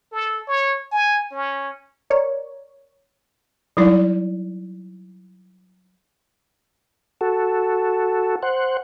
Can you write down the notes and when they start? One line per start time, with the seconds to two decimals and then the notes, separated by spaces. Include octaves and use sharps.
0.12 A4
0.48 C#5
0.92 G#5
1.32 C#4
2.10 A#4 C#5 D5
3.77 F#3 G3 D#4 E4 D5
7.21 F#4 A4
8.43 C5 F#5